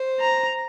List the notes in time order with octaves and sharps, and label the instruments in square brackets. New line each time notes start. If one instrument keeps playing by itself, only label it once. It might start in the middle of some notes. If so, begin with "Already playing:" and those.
Already playing: [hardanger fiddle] C5
[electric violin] A#5